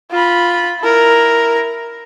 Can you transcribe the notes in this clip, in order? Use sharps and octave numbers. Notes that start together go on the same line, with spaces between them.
F4 B5
E4 A#4